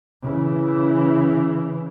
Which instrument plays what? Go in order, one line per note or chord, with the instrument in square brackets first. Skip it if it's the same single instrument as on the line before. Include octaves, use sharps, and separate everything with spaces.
[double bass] C#3 E3